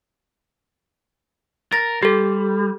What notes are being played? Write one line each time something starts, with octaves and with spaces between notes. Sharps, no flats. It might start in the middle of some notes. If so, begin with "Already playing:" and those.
A#4 A6 A#6
G3 G4 A4